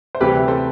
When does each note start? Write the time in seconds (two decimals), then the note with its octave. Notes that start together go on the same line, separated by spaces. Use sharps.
0.15 C5
0.20 D2 C3 E3 G3 C4 G4 B4
0.48 A4 C5